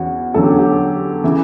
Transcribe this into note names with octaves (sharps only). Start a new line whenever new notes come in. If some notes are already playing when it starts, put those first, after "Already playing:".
Already playing: E2 C#4 F#4
E2 D3 F#3 C#4 A4
G4
F#4
G4
C#3 E3